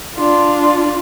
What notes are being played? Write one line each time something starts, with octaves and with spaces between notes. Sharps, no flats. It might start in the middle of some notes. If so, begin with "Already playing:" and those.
D4 F4